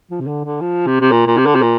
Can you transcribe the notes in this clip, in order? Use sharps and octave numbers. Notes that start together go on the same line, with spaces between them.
F3
C3
D3
D3
F3
C3
C3
A#2
A#2
C3
D3
C3
A#2